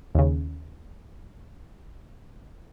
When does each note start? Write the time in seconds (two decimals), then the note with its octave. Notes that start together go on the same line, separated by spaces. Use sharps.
0.15 D#2 C#3